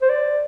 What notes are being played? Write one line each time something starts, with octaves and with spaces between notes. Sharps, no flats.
C5
D5